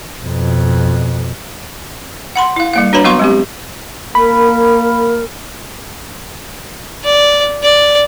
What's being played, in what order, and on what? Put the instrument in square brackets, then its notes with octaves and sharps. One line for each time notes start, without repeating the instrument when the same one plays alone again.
[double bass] F2 B2
[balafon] F#5 B5 C6
E4 F5
G3 A#3 F5
D4 F#4 B4 C#5 A#5 B5
F#3 B3 F#4 F5 C6 C#6
G#3 C4 G4
[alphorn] A#3 [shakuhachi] A#4 [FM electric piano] B5
[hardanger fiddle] D5
D5